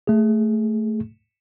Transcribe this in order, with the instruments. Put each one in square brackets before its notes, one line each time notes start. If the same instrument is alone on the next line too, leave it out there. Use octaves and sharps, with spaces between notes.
[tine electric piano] A3 G#4